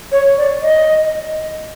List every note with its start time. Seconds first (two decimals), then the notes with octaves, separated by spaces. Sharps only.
0.12 C#5
0.37 D5
0.62 D#5